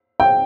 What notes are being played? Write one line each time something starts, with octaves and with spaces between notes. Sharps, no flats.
G5